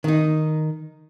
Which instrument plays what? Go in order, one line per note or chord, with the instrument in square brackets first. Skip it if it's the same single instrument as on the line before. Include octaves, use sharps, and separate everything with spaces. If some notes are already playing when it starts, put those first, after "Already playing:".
[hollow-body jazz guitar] D#3 D#4